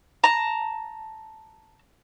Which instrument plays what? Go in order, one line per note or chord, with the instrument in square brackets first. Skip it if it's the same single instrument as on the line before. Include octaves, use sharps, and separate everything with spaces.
[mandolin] A5 A#5